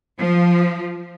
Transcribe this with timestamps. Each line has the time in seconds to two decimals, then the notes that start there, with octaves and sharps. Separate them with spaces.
0.19 F3